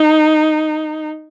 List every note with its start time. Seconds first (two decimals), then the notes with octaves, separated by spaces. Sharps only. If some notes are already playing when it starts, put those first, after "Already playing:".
Already playing: D#4